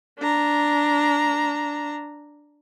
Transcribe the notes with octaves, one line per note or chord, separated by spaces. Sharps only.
D4 A#5